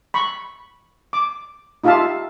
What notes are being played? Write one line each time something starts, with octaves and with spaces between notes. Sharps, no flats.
B5 C#6
D6
D#4 F4 G4 E5 F5 A5